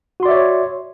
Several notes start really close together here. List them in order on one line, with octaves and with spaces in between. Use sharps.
F#4 C6 D5 E5 C#5